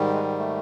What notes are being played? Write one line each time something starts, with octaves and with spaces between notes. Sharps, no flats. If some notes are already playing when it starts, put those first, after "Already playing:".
Already playing: G#2 D#3 G3
G#3
A3